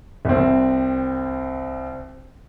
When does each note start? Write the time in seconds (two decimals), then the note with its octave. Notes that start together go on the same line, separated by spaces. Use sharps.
0.25 C2 C4